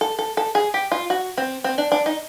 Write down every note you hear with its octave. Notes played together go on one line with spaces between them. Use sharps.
A4
A4
A4
G#4
G4
F4
F#4
C4
C4
D4
D4
D#4